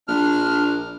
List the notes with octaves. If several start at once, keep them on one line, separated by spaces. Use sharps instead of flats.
A#1 D4 F6